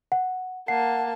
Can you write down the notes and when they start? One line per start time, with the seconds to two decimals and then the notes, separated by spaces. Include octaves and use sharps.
0.12 F#5
0.68 A#3 F#5 A5 C7